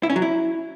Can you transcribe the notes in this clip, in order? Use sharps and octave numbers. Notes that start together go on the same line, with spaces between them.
E4
C#4
F#3
E4